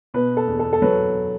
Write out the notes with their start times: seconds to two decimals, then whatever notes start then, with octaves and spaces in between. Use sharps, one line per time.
0.14 B2 B4
0.37 A4
0.48 E2
0.59 A4
0.73 A4
0.82 F#3 B4